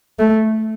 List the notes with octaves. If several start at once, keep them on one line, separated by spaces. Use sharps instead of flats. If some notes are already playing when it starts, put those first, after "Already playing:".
A3